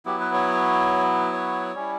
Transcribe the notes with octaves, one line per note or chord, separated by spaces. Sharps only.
F#3 B3 E4 G4
B4
C#5
C#5
G3 C#4 E4